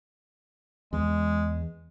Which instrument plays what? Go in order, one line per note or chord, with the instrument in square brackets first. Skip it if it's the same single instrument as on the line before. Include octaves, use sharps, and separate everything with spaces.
[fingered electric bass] E2 [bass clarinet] G#3